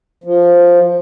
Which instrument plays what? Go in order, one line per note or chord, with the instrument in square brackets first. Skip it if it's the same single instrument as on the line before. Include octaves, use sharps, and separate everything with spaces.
[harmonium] F3